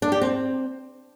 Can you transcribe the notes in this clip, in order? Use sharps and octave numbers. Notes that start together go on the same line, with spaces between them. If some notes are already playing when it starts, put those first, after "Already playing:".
D4
G4
C4